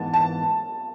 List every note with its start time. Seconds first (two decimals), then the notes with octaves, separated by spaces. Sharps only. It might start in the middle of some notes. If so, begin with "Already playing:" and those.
Already playing: G#2 E3 G#3 B3 A5
0.14 A5